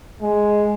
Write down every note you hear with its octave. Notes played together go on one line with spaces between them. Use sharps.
G#3